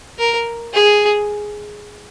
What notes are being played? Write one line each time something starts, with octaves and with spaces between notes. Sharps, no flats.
A#4
G#4